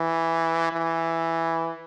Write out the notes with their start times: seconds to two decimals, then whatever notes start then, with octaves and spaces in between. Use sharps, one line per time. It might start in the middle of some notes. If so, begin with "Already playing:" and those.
Already playing: E3
0.73 E3